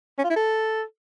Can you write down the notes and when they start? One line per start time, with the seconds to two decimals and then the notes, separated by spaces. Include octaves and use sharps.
0.18 C#4
0.24 F4
0.30 E4
0.36 A4